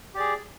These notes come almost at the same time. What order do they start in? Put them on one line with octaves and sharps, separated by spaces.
G4 D5 G#4